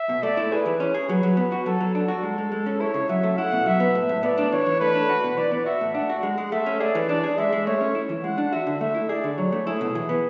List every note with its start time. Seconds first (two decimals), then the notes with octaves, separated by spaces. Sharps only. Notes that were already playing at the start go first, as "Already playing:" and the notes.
Already playing: E5
0.09 B2
0.23 A3 D5
0.37 E4
0.52 G#4 B4
0.66 E3
0.80 C#4 C#5
0.94 G#4
1.09 F#3 B4
1.23 F#3
1.37 B3
1.52 F#4
1.66 F#3 A4
1.81 F#3
1.95 D4 A4
2.08 F#4
2.23 G#3
2.38 G#3
2.52 G#3
2.66 C#4
2.80 E4 C#5
2.94 C#3
3.09 F#3 E5
3.23 A3
3.37 E4 F#5
3.52 B2
3.66 F#3 E5
3.80 B3
3.95 A2
4.09 A2
4.23 B3 D5
4.38 D4
4.52 E3 C#5
4.66 E3
4.80 A3 B4
4.95 D4
5.09 F#4
5.24 B2
5.37 E3 D5
5.51 B3
5.66 F#4 E5
5.81 A2
5.95 D4 F#5
6.10 F#4
6.23 G#3
6.38 G#3
6.52 A3 E5
6.66 C#4
6.80 G#4 D5
6.95 E3
7.09 D4 D5
7.24 G#4
7.38 G#3 E5
7.52 G#3
7.66 A3 C#5
7.81 C#4
7.95 E4
8.09 E3
8.24 G#3 F#5
8.38 D4
8.52 F#4 E5
8.67 D3
8.81 A3 E5
8.95 E4
9.09 G#4 D5
9.24 D3
9.37 F#3 C#5
9.52 A3
9.66 E4 G#4
9.81 B2
9.95 E3
10.09 B3